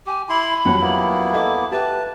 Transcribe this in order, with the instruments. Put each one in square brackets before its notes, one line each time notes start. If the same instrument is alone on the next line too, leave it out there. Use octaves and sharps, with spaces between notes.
[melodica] G4 [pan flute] G#5
[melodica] E4 C6 [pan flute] B5
[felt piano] F2 F#3 G3 [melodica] F#5
[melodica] A#3 B3 E4
[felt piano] A4 D#5 E5 [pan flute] D6
[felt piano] G4 E5 G5 [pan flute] B4 [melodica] A5